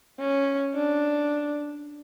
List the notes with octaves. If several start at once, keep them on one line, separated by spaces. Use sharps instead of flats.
C#4
D4